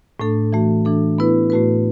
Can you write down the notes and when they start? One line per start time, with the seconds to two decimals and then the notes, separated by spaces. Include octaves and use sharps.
0.20 A2 A3 D4 A4
0.53 E3 A3 F#4
0.85 E3 D4 A4
1.18 E3 B3 E4 B4
1.50 A2 A3 F#4 B4